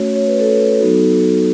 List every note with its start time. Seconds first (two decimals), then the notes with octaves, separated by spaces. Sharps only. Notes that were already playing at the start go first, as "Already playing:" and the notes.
Already playing: A3 C#4 F#4 C#5
0.15 C#5
0.27 B4
0.40 A4
0.52 B4
0.79 F#3 B3 D#4 F#4 A4